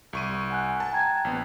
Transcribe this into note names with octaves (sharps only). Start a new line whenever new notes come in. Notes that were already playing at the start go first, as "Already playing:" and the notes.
C2 C#6 D#7
F#5 G#5 F#6
A5
G5 A#5 G#6
A#1 B3